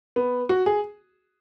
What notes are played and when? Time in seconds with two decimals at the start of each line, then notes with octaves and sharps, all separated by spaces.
0.16 B3
0.49 F#4
0.66 G#4